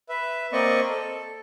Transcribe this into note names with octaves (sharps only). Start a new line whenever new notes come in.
B4 E5
A#3 C4 D5 D#5 C#6
A4